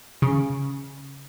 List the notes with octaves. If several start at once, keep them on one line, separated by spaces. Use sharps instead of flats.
C#3